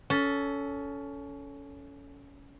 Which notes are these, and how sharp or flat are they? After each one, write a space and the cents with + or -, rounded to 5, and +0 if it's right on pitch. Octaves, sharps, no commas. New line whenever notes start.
C#4 +20 A4 +0